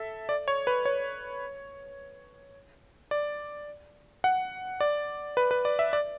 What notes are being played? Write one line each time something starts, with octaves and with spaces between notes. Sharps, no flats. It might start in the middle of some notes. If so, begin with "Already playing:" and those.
Already playing: A4 E5
D5
C#5
B4
C#5
D5
F#5
D5
B4
B4
D5
E5
D5